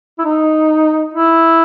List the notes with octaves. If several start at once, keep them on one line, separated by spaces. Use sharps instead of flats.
E4
D#4
E4